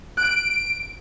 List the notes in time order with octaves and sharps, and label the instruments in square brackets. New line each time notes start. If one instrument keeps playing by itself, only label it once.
[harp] F#6 [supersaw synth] D7